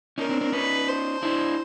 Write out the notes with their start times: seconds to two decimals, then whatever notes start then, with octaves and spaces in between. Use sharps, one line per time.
0.18 C#4 D#4 A#4
0.29 C4 D4
0.41 C4 D4
0.52 C#4 D#4 B4
0.88 C5
1.23 D4 E4